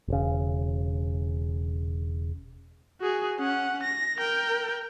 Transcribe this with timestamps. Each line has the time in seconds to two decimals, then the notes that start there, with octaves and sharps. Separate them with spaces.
0.08 E1 C#3
3.01 F#4 G#4
3.38 C#4 F#5
3.83 A#6
4.18 A#4 G5